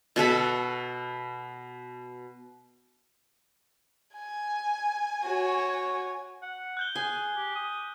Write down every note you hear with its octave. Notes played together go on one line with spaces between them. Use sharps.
B2 F#4 A4 B5
G#5
F#4 C#5
F#5
F#6 G6 G7
G#4 G#5
G4
D#6